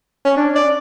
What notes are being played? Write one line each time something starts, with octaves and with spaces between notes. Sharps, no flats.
C#4
D4
D5